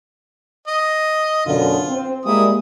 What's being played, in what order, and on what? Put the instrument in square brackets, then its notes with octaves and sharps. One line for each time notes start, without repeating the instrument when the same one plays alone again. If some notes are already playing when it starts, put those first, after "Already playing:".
[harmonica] D#5
[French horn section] F#2 B2 D3 [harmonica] F4
[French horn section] C4
[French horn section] G3 G#3 A#3 [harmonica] E4 D#6